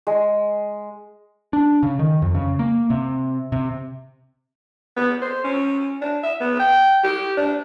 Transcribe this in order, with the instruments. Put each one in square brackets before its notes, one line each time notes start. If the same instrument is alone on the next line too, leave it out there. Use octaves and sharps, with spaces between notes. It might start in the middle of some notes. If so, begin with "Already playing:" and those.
[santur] G#3
[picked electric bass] D4
C#3
D#3
F2
C#3
A#3
C3
C3
[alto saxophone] B3
C5
C#4
D4
E5
B3
G5
G4
D4